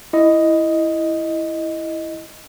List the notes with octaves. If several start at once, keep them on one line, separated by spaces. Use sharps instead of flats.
E4 D#5